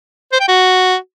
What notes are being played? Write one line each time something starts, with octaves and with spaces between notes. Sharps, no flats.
C5
G5
F#4